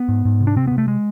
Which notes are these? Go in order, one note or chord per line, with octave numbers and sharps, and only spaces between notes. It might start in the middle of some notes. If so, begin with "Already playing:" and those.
Already playing: B3
G#2
G#2
C3
D4
C3 C4
C3 B3
A3
G#3